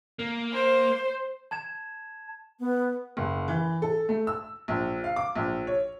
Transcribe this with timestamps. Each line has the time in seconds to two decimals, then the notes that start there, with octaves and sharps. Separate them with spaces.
0.19 A#3
0.53 C5
1.51 A5 G#6 E7
2.60 B3
3.17 F#1
3.48 E3
3.82 A4
4.09 A3
4.27 E6
4.68 A#1
5.04 F5
5.16 D6
5.36 A#1
5.67 C#5